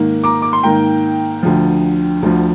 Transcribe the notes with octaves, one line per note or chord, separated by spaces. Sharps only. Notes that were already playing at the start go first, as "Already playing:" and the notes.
Already playing: G#2 D#3 A#3
A#5 D6
D6
C6
G#2 D#3 A#3 G5 A#5
D2 D3 F3
D2 D3 F3